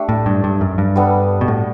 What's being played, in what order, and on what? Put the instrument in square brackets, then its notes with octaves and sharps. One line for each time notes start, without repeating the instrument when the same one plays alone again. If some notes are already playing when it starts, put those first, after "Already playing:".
Already playing: [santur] A3 D4 G4 D5
[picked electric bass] A2
G2
G2
F#2
G2
[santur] G3 B3 D4 A4
[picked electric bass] B2
A2